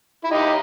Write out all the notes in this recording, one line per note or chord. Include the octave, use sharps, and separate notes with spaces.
E4
D#4 G4